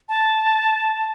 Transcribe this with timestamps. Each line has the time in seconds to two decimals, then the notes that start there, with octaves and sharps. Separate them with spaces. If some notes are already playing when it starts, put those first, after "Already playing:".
0.09 A5